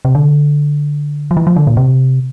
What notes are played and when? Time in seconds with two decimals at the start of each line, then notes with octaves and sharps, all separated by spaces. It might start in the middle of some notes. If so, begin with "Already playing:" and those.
0.05 C3
0.15 D3
1.31 F3
1.37 E3
1.47 F3
1.56 D3
1.67 A#2
1.77 C3